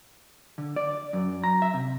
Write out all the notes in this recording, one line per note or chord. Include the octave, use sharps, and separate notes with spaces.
D3
D5
F#2
A#5
E5
C3